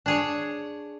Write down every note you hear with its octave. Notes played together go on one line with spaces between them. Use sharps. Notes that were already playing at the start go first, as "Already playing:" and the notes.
D4 G#4 C#5